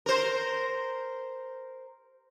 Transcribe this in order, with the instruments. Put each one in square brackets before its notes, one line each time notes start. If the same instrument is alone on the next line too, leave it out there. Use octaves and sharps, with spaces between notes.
[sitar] A#4 C5